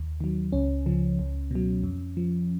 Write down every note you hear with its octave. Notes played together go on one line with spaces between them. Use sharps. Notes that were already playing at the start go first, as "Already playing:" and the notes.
Already playing: D#2
D#3 F#3
C#2 C#4
C#3 F3
C#2
B2 F#3
F2
F3